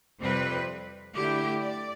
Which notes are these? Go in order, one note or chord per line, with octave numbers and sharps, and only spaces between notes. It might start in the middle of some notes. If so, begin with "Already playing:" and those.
F2 C3 G3 C4 B4
D3 A3 E4 G4
D5